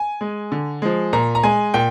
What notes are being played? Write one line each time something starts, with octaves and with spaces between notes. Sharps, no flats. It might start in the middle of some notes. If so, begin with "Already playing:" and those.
Already playing: G#5
G#3
D3
F3 G#3
A#2 A#5
A#5
G#3 G#5
A#2 G5